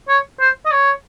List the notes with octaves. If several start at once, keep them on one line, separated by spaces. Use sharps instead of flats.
C#5
C5
D#5
C#5